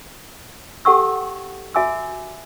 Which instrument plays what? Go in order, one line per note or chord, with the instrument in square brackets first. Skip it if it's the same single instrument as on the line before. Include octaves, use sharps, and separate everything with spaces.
[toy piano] G4 A4 F#5 G5 C#6 E6
F#4 E5 G#5 D6 E6